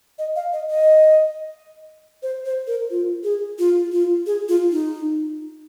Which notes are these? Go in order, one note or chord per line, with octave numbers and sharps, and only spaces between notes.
D#5
F5
D#5
D#5
C5
C5
A#4
F4
G#4
F4
F4
G#4
F4
D#4